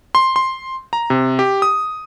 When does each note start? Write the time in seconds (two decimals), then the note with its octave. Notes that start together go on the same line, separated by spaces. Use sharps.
0.15 C6
0.36 C6
0.93 A#5
1.10 C3
1.39 G4
1.62 D#6